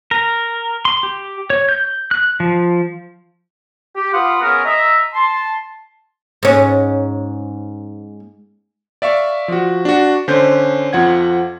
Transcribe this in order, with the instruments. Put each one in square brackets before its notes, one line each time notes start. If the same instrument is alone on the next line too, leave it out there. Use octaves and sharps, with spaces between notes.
[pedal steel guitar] A#4
C6
G4
C#5
G6
F#6
F3
[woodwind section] G4
F4 B4 F5 F#5 C6 D#6
B3 C#4 G#4 A#4
D#5 E5 A#5
A5 C6
[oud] G#2 C#4
[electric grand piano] D5 E5 F5 C#6
F3 F#4
D4 F#4
D3 C#4 C5 G6
F2 F3 F#5 G#6